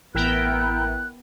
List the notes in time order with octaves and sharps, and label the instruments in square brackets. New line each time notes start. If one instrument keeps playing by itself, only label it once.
[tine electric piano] A1 [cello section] B3 [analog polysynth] E4 A#4 G5 [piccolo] F#6